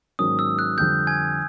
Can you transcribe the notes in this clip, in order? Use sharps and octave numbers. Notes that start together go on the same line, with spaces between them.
G#2 D#3 F#3 A#3 C#4 D#6
E6
F#6
F2 D3 G3 G6
G#5 G#6